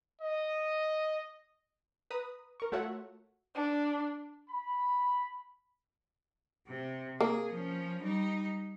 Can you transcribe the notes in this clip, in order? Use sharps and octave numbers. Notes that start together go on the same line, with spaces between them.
D#5
B4 A#5 D#6
A#4 C#6
A3 F4 F#4 C#5 E5 F#5
D4
B5
C3
A#3 G#4
F3 C#4
G3 D#4